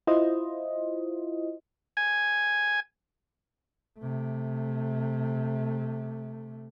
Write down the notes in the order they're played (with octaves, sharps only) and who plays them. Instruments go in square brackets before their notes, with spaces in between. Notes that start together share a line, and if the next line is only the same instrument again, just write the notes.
[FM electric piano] E4 F4 C5 D#5
[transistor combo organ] G#5
[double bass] C3 A3